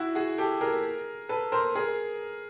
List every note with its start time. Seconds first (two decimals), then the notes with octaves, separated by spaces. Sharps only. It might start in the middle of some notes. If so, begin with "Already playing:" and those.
Already playing: E4 F#4
0.15 F#4 G#4
0.38 G4 A4
0.61 G#4 A#4
1.29 A4 B4
1.52 A#4 C5
1.75 G#4 A#4